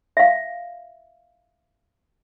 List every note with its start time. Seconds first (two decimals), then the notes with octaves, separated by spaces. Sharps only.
0.17 E5 F5